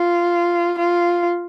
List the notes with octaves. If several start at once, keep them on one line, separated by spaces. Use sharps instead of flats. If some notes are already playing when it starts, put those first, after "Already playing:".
Already playing: F4
F4